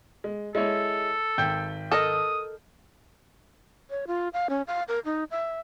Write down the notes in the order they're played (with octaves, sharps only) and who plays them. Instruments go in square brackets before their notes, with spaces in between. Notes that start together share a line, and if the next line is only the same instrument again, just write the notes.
[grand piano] G#3
[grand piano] G#3 E4 C#5 [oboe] A4
[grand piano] G#1 G5 G6
[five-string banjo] A4 A#4 D#5 [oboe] D#6
[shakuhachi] C#5
F4
F5
C#4
F5
A#4
D#4
E5